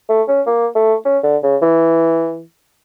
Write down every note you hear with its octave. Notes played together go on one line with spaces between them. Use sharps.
A3
C#4
A#3
A3
C#4
D3
C#3
E3